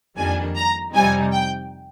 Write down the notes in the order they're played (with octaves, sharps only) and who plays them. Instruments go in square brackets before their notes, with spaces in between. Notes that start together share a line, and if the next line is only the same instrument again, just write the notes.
[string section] F2 D#3 G3 A#3 D4 G#5
A#5
F2 C3 G3 C4 D#4 G#5
G5